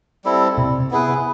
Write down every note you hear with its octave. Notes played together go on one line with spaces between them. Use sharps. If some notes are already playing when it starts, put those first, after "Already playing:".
G3 C4 E4 A4
C3
B3 E4 G#4 B4